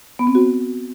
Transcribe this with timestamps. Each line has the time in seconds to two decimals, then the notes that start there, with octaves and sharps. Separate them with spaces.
0.19 B3
0.27 C4
0.35 F#4